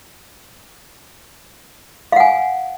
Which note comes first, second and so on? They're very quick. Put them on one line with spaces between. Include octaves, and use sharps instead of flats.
F5 F#5 G#5